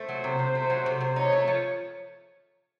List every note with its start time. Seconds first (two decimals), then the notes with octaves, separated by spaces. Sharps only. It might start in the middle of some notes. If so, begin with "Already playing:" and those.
Already playing: A3 C5
0.09 F#3
0.24 C3
0.39 C3
0.55 A3
0.70 F#3
0.86 C3
1.01 C3
1.16 D#4 C#5
1.32 A3
1.48 F3